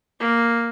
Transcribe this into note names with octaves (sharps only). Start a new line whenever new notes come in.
A#3